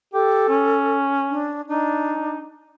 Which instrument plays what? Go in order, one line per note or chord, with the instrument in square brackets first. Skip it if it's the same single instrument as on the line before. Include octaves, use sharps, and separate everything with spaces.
[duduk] G4 [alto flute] A4
[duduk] C#4
[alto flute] D4
[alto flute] D4 [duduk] D#4